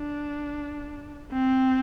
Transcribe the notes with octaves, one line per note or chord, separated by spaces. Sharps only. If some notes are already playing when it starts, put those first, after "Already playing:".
Already playing: D4
C4